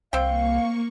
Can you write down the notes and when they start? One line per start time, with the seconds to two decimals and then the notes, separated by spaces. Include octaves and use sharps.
0.13 C2 A#3 C4 F5 G5 C#6